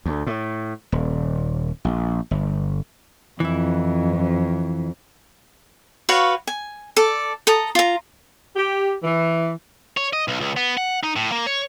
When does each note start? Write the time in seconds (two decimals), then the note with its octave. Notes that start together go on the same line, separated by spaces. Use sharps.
0.06 D2
0.27 A2
0.92 D#1
1.85 A#1
2.31 G1
3.40 F2 E3 E4
6.09 F#4 B4 C#5 F5
6.47 G#5
6.96 A4 D5
7.47 A4 A#5 D#6
7.75 F4 A#5
8.56 G4
9.04 E3
9.97 C#5
10.13 D#5
10.28 B1
10.40 C#2
10.57 B3
10.77 F#5
11.03 D#4
11.16 A2
11.32 A#3
11.47 C#5